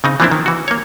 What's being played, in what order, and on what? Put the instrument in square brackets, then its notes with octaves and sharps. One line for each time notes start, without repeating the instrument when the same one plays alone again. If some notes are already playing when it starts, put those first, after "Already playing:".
[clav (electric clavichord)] C#3 C4 D#4
E3 F3 A#3 C4 D4 E4
D#3
E3 F#4
A#3 C#5